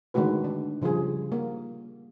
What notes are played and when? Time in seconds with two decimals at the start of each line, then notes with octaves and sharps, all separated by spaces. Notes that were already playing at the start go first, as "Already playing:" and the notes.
0.14 D3 D#3 G#3 A3 F#4 B4
0.44 D4
0.82 C#3 F3 G3 F4 G#4
1.32 A#3